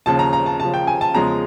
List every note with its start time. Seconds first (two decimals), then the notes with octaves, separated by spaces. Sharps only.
0.06 D#2 C#3 F3 A5
0.19 A#5
0.33 A#5
0.46 A5
0.60 D#2 C#3 F3 A5
0.74 G5
0.87 G#5
1.01 A5
1.14 E2 C#3 F3 G#3 A#5